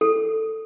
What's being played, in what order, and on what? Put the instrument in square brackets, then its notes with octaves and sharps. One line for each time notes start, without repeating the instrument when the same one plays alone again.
[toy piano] A4